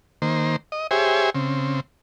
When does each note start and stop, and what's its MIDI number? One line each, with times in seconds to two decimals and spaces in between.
0.22 0.56 51
0.22 0.56 58
0.22 0.56 72
0.72 0.87 75
0.91 1.30 67
0.91 1.30 68
0.91 1.30 72
0.91 1.30 73
0.91 1.30 76
0.91 1.30 80
1.35 1.80 49
1.35 1.80 60